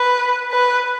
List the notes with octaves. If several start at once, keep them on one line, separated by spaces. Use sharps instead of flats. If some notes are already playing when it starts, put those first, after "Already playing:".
Already playing: B4
B4